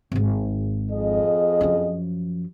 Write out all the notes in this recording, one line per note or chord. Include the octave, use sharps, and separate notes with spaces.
G#1 G#2
F2 G#4 D#5
F#2 F3